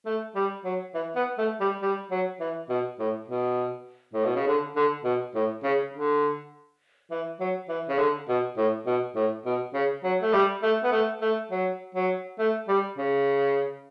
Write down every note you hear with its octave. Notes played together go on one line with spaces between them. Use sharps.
A3
G3
F#3
E3
B3
A3
G3
G3
F#3
E3
B2
A2
B2
A2
B2
C#3
D3
D3
B2
A2
C#3
D3
E3
F#3
E3
C#3
D3
B2
A2
B2
A2
B2
C#3
F#3
A3
G3
A3
B3
A3
A3
F#3
F#3
A3
G3
C#3